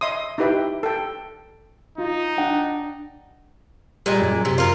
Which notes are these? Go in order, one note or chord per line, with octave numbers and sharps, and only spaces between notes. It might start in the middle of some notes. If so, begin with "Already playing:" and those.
D#5 E5 C6 D#6
D#4 E4 G4 B4 E5 G5
A4 G5
D#4 F4
D4 F#5 G5
A#2 G3 G#3
F#2
C3
F4 A#4